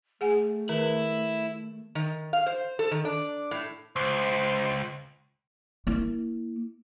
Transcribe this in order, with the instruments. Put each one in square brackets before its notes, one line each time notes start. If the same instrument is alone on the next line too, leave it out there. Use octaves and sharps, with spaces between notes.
[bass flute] A3 [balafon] G#4 F#5 G#5
[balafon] D#3 B4 [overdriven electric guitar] E4
[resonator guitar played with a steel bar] D#3
F5
C5
A4
D#3
D4
A2
[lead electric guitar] C#2 [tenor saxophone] C5
[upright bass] A#3 E4